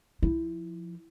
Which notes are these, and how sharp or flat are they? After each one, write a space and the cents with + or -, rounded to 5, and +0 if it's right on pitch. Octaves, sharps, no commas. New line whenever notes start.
F3 +0 E4 +0